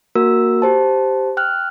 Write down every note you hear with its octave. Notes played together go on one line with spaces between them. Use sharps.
A#3 F#4 A#4 E6
G4 C5 A5
G5 F6 F#6